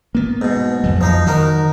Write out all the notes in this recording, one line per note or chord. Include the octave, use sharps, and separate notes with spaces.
A#3 B3
G#2 B2
F2 F#3
F3 D#4 D#5
D#3 D#4 F#4 A#4